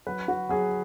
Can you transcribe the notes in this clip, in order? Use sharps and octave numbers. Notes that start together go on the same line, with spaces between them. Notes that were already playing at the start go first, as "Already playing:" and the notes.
F#3 B4
F#3 F#4
F#3 G#4